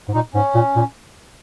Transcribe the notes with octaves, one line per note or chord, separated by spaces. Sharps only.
G#2
A#2 D#4
G#2 C#4
A#2
A#2